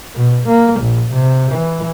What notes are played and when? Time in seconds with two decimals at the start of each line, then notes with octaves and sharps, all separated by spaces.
0.15 B2
0.48 A#3
0.81 A#1
1.13 C3
1.52 E3